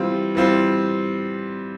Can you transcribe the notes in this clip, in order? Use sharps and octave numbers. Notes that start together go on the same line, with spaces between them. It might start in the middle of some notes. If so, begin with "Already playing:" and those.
Already playing: E3 G3 C4 F4
E3 G3 C4 F4